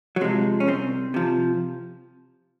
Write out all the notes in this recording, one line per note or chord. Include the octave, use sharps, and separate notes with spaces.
F#3
C3 F3 G#3
C#4
C2 C4
C3 F3